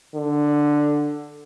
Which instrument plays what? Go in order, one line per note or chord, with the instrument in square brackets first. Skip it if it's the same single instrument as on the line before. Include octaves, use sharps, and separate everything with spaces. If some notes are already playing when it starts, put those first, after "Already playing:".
[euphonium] D3